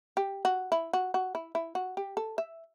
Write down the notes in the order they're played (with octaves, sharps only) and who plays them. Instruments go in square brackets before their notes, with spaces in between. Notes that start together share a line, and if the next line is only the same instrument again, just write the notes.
[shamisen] G4
F#4
E4
F#4
F#4
E4
E4
F#4
G4
A4
E5